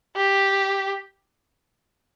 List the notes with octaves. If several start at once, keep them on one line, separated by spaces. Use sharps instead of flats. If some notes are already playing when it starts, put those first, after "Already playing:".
G4